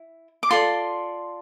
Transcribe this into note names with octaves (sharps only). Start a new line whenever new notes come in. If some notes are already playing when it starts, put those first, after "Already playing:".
Already playing: E4
D6
F4 A4 D5 C6